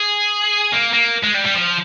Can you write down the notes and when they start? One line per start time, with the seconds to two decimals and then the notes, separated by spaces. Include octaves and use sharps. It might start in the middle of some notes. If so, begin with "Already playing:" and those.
Already playing: G#4
0.72 A#3
0.93 A#3
1.23 G#3
1.34 G3
1.45 G3
1.54 F3